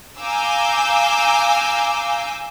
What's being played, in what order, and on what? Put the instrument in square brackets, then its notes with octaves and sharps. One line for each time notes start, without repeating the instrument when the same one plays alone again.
[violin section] F5 G#5 A#5 D6 E6 G6